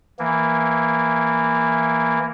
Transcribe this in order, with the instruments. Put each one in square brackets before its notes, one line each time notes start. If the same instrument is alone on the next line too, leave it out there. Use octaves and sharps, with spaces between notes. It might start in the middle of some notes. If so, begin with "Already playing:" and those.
[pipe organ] E3 A#3